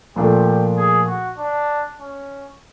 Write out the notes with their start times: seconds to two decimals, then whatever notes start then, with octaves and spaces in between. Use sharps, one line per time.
0.16 A#2 F3 A3 D4 G4
0.77 G#4
1.07 F#4
1.38 D4
2.00 C#4